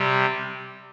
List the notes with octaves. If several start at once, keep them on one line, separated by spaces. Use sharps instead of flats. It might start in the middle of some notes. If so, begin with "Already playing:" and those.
Already playing: C3 G3